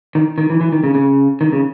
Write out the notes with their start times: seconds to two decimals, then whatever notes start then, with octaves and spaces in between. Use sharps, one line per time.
0.15 D#3
0.38 D#3
0.50 E3
0.61 E3
0.72 D#3
0.84 C#3
0.95 C#3
1.41 D#3
1.52 C#3